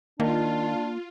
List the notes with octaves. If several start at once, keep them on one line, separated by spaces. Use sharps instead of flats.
D#3 A#3 D4 F4